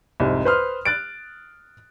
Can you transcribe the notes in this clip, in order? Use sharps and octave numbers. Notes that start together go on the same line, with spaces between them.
C2 F2 G#2
B4 C5 C6 D#6 F6
F#6 A6 D7